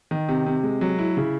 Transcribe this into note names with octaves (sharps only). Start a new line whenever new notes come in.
D#3
C3
C3
G#3
F#3
E4
C#3